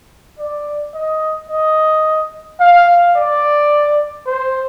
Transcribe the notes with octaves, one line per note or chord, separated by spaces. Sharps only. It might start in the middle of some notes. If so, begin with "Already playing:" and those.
D5
D#5
D#5
F5
D5
C5